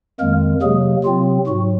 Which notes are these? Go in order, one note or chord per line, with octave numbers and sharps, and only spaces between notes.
F2 D#3 G#3 A#3 A#4
C3 F#3 G#3 A#3 G#4
C3 F#3 C4 F4
G#2 F#3 F#4